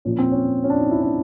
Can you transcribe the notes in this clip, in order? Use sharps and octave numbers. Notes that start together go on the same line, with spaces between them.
A#2 F3 C#4
C4
C#4
C#4
D4
D#4
E4
D4